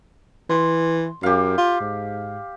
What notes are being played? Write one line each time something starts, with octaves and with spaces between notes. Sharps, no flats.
E3 C6
F#2 G4 F5
F4
G#2